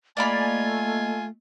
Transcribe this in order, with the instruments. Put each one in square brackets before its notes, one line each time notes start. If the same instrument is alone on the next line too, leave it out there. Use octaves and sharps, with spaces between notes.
[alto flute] A3 [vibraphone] A#3 D#5 [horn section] F4 G#5 [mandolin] D5 F5 B5